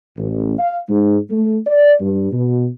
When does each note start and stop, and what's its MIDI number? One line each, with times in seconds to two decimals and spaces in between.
0.17 0.55 33
0.58 0.76 77
0.88 1.17 44
1.30 1.56 57
1.66 1.92 74
2.00 2.28 43
2.32 2.66 47